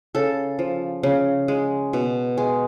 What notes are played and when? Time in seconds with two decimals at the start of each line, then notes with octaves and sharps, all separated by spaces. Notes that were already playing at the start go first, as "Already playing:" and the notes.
0.15 C#3 A4
0.59 F3
1.03 C#3
1.48 G#3
1.93 B2
2.37 G#3